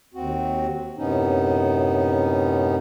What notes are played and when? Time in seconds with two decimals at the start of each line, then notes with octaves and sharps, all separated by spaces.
0.14 D#2 C4 F#4
0.97 F#2 A2 C3 B3 C#4 D#4